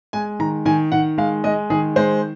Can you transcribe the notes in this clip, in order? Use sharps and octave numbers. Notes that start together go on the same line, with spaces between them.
G#3 G#5
D#3 A#5
D#3 G#5
D#3 F#5
G#3 F5
G#3 D#5
D#3 G#4
G#3 C5